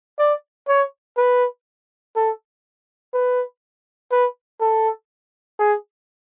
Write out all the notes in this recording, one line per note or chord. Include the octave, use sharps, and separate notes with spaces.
D5
C#5
B4
A4
B4
B4
A4
G#4